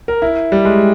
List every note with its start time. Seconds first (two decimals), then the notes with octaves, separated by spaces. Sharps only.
0.08 A#4
0.22 E4
0.52 G3
0.65 G#3